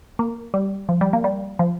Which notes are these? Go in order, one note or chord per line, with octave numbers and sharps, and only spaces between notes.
A#3
G3
F3
G3
A#3
G3
F3